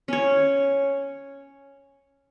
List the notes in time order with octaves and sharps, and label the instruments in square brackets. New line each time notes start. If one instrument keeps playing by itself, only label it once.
[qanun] C#4 C#5